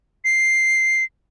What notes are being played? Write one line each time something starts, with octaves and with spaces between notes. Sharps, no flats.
C7